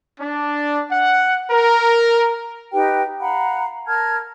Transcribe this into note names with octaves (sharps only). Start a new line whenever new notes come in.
D4
F#5
A#4
D#4 G4 B4 G5
F5 F#5 A#5 B5
A#4 A5 F6 G#6